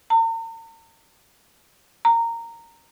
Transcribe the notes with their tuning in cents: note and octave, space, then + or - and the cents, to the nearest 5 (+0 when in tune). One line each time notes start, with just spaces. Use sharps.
A#5 -45
A#5 -15